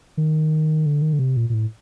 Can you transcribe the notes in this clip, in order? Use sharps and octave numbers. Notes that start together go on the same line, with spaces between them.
D#3
D3
D#3
D3
C3
A#2
A#2
A2